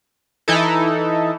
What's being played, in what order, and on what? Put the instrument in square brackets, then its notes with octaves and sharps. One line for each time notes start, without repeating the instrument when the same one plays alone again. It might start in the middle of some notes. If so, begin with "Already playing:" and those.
[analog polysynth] E3 D#4 E4 A4